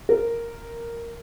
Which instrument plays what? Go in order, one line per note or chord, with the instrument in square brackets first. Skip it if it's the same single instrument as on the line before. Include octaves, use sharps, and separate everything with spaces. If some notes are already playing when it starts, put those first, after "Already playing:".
[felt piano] A#4